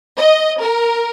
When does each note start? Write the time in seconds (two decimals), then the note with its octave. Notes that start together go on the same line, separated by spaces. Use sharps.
0.17 D#5
0.60 A#4